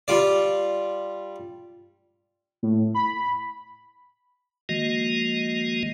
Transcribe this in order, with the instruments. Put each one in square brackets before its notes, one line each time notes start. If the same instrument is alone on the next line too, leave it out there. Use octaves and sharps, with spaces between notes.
[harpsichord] G3 F4 D5
[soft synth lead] A2
B5
[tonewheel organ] D#3 F3 G#3 A#3 F#4 D#5